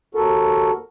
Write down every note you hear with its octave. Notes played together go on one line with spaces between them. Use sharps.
D#2 F#4 A4 A#4